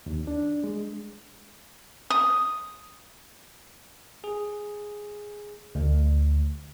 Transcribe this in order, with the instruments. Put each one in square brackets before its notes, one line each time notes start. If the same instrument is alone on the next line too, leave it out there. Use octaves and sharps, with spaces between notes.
[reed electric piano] D#2
D4
G#3
[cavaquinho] D#6
[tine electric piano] G#4
D2